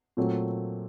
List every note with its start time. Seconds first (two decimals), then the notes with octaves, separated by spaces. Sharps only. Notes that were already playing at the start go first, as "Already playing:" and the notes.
0.17 A#2 F#3 A3 C4